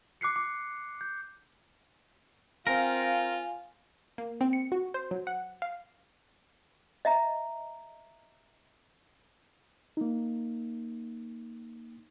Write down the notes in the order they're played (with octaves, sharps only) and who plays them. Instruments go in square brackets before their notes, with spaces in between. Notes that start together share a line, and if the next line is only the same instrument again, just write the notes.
[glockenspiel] D6 F#6 C7 C#7
D6
G6
[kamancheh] C4 [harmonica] F4 [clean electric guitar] A#4 [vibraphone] F5 G#5
[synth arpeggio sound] A#3
C4
C#7
F#4
C5
F#3
F#5
F5
[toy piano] D#5 E5 A#5
[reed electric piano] A#3 D#4